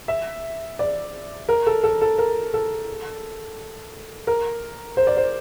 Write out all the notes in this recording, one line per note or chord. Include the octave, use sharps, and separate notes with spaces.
E5
D5
A#4
A4
A4
A4
A#4
A4
A#4
C5
D5
C5